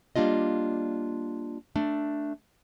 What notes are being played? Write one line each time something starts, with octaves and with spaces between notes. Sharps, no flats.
G3 A#3 D4 F4 D#5
A3 D4